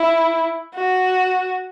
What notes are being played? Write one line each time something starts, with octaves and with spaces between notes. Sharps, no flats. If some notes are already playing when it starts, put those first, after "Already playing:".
Already playing: E4
F#4